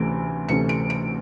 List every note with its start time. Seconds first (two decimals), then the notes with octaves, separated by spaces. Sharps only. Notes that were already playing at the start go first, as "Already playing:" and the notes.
Already playing: D2 C3 E3 A3 C#4 D7
0.49 D2 C3 E3 A3 C#4 C#7
0.69 D7
0.90 D7